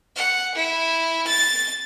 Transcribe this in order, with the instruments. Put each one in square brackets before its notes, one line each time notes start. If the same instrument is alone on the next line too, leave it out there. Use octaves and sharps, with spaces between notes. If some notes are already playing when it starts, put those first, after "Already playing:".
[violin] F#5
E4
A6